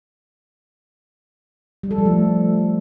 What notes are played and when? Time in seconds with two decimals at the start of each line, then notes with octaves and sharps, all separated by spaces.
1.83 G3
1.91 A4
1.98 F3
2.05 A3